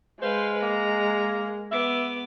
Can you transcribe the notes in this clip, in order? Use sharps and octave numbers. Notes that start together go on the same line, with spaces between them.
G#3 B4 C5 F5
A#3 A#5
B3 E5 D6